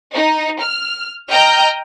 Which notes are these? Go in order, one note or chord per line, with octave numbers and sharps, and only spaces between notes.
D#4
F6
D#5 G5 A#5 F6 G6